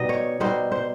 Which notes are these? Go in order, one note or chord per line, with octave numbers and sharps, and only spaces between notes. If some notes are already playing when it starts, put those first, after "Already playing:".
Already playing: B2 G3 C4 D#4 D#5
C#5
B2 G3 C4 D#4 C5
C5